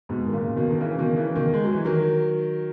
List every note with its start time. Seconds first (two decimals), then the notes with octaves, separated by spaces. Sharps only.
0.09 G#2 B2
0.27 D#3
0.33 A#2 C#3
0.56 B2 D#3
0.70 D#3
0.81 C#3 E3
0.98 B2 D#3
1.16 C#3 E3
1.35 B2 D#3
1.54 G#3
1.64 F#3
1.74 E3
1.85 D#3 F#3